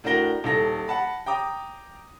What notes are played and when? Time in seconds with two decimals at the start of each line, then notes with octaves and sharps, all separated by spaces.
0.04 A2 D4 F#4 A#4 A#6 G7
0.44 D#1 A4 A#6
0.87 F#5 A5 B5
1.26 G5 A#5 D6 D#6